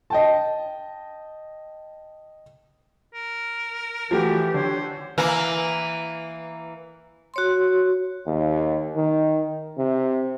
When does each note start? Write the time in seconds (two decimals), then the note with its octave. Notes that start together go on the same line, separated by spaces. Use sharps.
0.10 D#5 G5 A5
3.14 A#4
4.11 E3 F3 A3 F#4 G4
4.54 D3 C5 C#5
5.18 E3 A#3
7.34 F#4 C#5 C6
8.26 D#2
8.96 D#3
9.78 C3